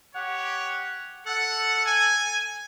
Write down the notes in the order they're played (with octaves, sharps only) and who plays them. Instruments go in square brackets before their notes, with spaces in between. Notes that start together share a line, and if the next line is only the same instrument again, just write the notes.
[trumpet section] G4 C#5 [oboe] F#5
[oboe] A4 [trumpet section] F#5
[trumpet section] G#5